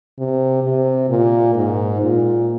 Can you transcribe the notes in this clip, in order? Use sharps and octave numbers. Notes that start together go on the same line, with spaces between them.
C3
C3
A#2
G#2
A#2